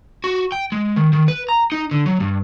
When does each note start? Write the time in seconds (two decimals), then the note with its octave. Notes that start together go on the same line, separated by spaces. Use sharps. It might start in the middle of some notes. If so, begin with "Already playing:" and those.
0.24 F#4
0.52 G5
0.72 G#3
0.96 D#3
1.13 D#3
1.28 B4
1.49 A#5
1.72 D#4
1.91 D3
2.06 F#3
2.20 G2